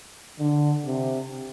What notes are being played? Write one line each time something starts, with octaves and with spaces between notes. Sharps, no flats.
D3
C3